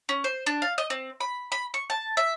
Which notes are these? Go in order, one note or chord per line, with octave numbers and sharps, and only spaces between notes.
C#4
C5
D4
F5
D#5
C4
B5
B5
C#6
A5
E5